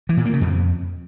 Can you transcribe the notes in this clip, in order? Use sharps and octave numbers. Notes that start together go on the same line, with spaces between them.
E3
A#2
A#3
C#3
F2